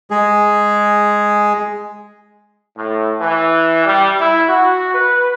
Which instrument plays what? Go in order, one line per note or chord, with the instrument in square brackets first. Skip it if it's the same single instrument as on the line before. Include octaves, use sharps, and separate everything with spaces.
[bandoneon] G#3 G#4
[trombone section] A2
E3
G3
E4
F#4
B4